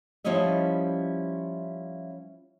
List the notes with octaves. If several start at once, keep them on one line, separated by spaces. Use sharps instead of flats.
F3 G3 C#4 E4 D#5 E5